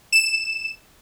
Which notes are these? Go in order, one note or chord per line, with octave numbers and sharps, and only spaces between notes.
E7